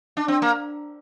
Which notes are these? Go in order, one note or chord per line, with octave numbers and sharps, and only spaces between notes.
D4
C4
A#3